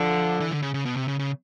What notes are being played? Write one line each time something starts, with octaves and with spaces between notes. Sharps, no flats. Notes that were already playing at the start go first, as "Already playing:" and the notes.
Already playing: D3 F3
E3
D3
C#3
C#3
B2
C3
C#3
C#3